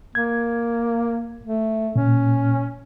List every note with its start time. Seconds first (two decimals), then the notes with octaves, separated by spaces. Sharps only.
0.15 A#3 G#6
1.45 A3
1.96 A#2 C#4